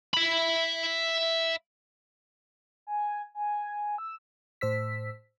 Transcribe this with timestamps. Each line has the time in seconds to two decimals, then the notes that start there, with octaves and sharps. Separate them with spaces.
0.14 E5 B5
2.87 G#5
3.35 G#5
3.98 E6
4.61 A2 C5 E6 B6